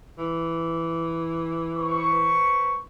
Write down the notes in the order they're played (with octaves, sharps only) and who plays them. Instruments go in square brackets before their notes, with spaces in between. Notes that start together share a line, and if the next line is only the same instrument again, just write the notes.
[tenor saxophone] E3
[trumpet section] B4 C5 C#6